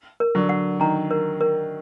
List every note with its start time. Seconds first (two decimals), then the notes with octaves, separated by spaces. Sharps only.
0.20 A#4
0.35 D3 F#3
0.49 F#5
0.80 D#3 A#5
1.11 A#4
1.41 A#4